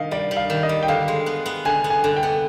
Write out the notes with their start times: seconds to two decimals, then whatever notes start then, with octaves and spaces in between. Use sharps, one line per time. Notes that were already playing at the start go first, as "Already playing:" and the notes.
Already playing: D#3 D#5 F5
0.11 G3 D5
0.31 G3
0.37 F5
0.50 D#3
0.63 D#5
0.69 G3
0.83 G5
0.88 D3 F5
1.08 G#3
1.26 B3
1.46 B3
1.65 D3 G#5
1.84 B3
1.90 G#5
2.04 D3
2.17 G5
2.23 B3